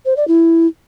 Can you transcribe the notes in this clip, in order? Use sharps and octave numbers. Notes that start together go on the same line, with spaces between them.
C5
D5
E4